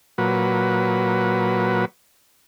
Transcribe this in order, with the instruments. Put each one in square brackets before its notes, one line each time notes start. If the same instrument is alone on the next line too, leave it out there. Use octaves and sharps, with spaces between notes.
[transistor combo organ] A#2 F#3 B4